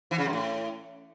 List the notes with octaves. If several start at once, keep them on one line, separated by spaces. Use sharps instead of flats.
E3
C#3
F#2
A2